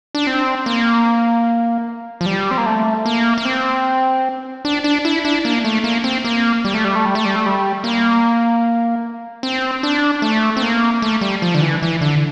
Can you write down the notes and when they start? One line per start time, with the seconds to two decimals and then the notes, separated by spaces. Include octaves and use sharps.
0.15 D4
0.27 C4
0.66 A#3
2.21 F3
2.26 G3
2.51 C4
2.58 A#3
2.66 A3
3.06 A#3
3.38 A#3
3.45 C4
4.65 D4
4.84 D4
5.05 E4
5.25 D4
5.45 A#3
5.65 A3
5.84 A#3
6.04 C4
6.24 A#3
6.65 G3
6.74 A3
6.84 G3
6.95 A3
7.05 G3
7.15 A3
7.25 G3
7.36 A3
7.46 G3
7.84 A#3
9.43 C4
9.83 D4
10.22 A3
10.57 C4
10.63 A#3
11.02 A3
11.21 G3
11.42 F3
11.55 D3
11.61 E3
11.82 E3
12.01 D3